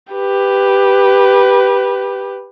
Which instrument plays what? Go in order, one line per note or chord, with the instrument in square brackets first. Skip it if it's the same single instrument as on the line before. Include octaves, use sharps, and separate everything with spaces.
[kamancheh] G4 B4